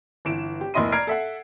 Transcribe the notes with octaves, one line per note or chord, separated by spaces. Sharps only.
G1 E3 D7 E7
G4
F1 A#3 E4 D#5 C6 D#7
D5 A#5 F6 G#6 C7 D7
A4 E5 F#5